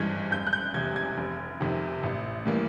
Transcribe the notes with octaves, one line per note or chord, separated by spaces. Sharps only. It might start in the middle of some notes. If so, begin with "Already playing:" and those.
Already playing: G#1 G2 E3 G#3 G#6
F1 G6
F#6
G6
E2 C3 G#6
G#6
F1
F2 C3 D#3
A1
A2 E3 G3 A#3